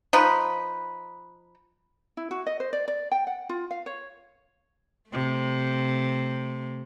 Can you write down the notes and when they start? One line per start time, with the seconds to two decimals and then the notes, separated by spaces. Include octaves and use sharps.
0.13 F3 D#4 B4
2.17 E4
2.31 F#4
2.46 D#5
2.60 C5
2.73 D5
2.88 D5
3.12 G5
3.27 F#5
3.49 F4
3.71 F5
3.86 C#5
5.10 C3 A3